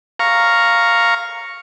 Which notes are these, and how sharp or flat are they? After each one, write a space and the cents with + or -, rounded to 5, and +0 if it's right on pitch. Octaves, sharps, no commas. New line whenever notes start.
F5 +0 A#5 +0 C#6 +0